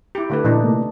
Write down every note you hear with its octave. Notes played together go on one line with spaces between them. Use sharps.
E4 G4
D3 A3 B4
A#2 E3 D4 D#4
C3 A3 A#3